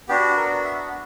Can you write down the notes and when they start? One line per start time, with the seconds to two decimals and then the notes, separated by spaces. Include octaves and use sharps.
0.08 B3 D4 F#4 G4
0.37 A#4
0.64 E5